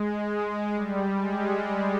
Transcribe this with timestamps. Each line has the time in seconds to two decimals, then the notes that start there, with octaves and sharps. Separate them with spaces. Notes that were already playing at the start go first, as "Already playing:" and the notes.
Already playing: G#3
0.27 G#3
0.74 G3
1.21 G#3